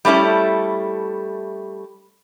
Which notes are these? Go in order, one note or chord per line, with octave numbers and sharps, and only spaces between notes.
G3 A3 C#4 E4 A4